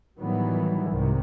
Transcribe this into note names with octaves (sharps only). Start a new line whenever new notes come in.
A2 D#3 E3 F#3 G3 B3
C2 G#2 C3 D#3